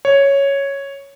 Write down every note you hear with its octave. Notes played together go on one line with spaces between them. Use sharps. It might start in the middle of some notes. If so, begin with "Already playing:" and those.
C#5